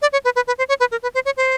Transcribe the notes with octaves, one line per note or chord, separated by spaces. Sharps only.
D5
C#5
B4
B4
B4
C5
C#5
B4
A#4
B4
C5
C#5
C5